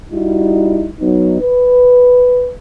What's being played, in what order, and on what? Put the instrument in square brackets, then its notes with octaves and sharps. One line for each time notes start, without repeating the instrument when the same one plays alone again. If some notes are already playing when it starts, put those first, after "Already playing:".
[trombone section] G3 D#4 E4 F#4
F#3 B3 D#4
B4